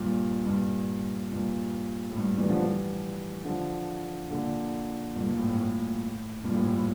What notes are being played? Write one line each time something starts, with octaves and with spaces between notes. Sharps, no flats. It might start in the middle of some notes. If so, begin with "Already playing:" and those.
Already playing: G2 A#2
G2 A#2
G2 A#2
A2
G2
E3 G3
D3 F3
E3 G3
D3 F3
A#2 D3
G2 A#2
G2 A#2
A2
A2
A2
G2 A#2
A2
A2
A2